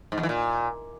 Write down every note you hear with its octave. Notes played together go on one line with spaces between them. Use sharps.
G#2
E2
E3
A#2